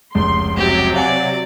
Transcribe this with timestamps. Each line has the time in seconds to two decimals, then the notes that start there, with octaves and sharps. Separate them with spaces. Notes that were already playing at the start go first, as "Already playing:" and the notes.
0.15 F1 C#2 C6
0.57 C3 F#3 G4
0.96 D5 F5 F#5 G#5